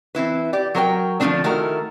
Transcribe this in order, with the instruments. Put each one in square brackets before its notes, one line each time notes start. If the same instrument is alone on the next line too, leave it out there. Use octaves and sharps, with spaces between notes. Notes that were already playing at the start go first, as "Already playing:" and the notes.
[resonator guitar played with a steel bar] E3 C4 E4 B4
G4 D5
F#3 A#4 C5 G5
D3 F3 F#3 A3 C4 D4
D#3 A3 E4 F#4 A#4